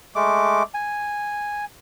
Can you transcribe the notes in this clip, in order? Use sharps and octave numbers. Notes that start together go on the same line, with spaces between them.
G#3 A3 D6
G#5